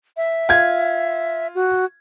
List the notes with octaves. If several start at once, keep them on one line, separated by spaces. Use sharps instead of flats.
E5
F4 G#6
F#4